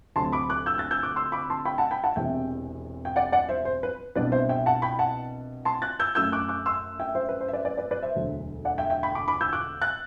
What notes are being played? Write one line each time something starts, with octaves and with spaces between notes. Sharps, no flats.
D2 C3 F#3 C4 A5 C6
B5 D6
D6 F#6
E6 G6
F#6 A6
E6 G6
D6 F#6
C6 E6
B5 D6
A5 C6
G5 B5
F#5 A5
G5 B5
F#5 A5
E1 E2 C3 E5 G5
G5
D5 F#5
D5 F#5
C5 E5
C5
B4
C2 B2 G3 B3 D4 B4 D5
C5 E5
E5 G5
F#5 A5
G5 B5
F#5 A5
A5 C6
F#6 A6
E6 G6
F#2 F#3 A3 E6 G6
D6 F#6
D6 F#6
C6 E6
E5 G5
C5 E5
B4
C5
E5
B4 D5
B4 D5
B4 D5
B4 D5
C5 E5
E1 D2 D3 F#3
D5 F#5
E5 G5
E5 G5
G5 B5
B5 D6
B5 D6
E6 G6
D6 F#6
F#6 A6